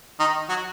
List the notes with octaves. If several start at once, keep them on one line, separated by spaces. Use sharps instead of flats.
D#3 D#4
F#3 F#4